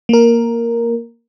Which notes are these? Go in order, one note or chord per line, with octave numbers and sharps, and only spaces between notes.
A#3 A#4